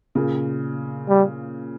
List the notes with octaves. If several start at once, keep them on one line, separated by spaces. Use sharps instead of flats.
A#2 C#3
G3